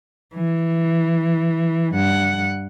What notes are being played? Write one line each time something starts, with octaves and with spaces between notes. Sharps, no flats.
E3
G2 F#5